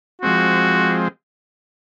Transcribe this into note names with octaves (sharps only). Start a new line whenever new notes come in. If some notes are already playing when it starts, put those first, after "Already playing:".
F3 G#3 C4 F#4